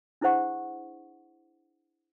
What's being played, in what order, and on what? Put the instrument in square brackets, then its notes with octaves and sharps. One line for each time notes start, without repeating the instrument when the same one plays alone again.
[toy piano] D4 E4 G#4 C5 F#5 C#6